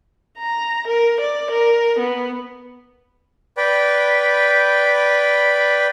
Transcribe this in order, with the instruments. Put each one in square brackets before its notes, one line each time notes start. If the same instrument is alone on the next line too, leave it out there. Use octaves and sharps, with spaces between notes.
[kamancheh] A#5
A#4
D5
A#4
B3
[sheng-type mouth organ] B4 D5 G5 B5